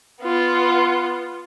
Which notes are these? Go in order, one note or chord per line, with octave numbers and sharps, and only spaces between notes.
B3 F4